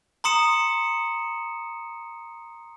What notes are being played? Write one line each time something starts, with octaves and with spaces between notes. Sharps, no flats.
A#5 C6 D#6 C#7 E7